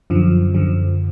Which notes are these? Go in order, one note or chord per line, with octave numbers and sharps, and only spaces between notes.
F#2 D3 F3
F#2 D3 F3